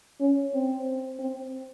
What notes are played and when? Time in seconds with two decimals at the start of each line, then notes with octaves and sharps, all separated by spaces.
0.20 C#4
0.54 C4
1.19 C4